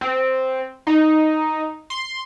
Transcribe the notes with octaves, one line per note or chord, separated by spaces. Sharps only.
C4
D#4
C6